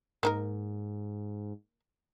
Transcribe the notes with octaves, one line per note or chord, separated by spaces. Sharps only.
G#2 A#3 D#4 A#4